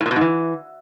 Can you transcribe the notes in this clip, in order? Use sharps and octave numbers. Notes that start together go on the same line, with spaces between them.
A2
A#2
B2
G#2
E3